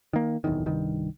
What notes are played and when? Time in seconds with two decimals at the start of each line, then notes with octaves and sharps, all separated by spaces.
0.13 D#3 A#3
0.44 D1 B1 E2 D#3
0.66 C2 G2 D#3